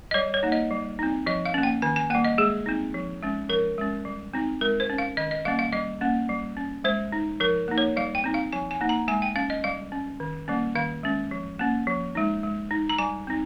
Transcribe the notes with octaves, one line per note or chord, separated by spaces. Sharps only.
D#5
G3 C#5
C#5
A#3 D#4
D#5
G3
C4 D#4
F3 D#5
F5
A#3 C#4
G5
D#3 G#5
G#5
G3 A#3 G5
D#5
G#3 G#4
C4 D#4
F3
G#3 C#4
F3 A#4
G#3 C#4
G3
C4 D#4
G#3 A#4
C5
C#4
F5
D#3 D#5
D#5
G3 A#3 C#4 F5
F5
G3 D#5
A#3 C#4
G3
C#4
G#3 C5
D#4
F3 A#4
A#3 D#4
C#5
G3 F5
G5
C4 D#4
F5
F3 G#5
G#5
A#3 D#4
A#5
G#3 G#5
G5
C#4 F5
D#5
G3 F5
C#4
D#3
G3 A#3 C#4
D#3 F5
G#3 C#4
F3
A#3 C#4
F3
G#3 D#4
G#3
D#4
A#5
G3 G#5
C4 D#4